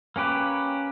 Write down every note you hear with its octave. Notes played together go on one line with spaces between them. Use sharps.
A#3 C#4 G4 B4